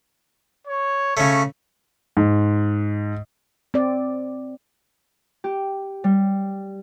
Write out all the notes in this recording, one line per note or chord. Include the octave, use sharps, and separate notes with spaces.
C#5
C#3 A3 C#5
G#2
C4 D5
G4
G3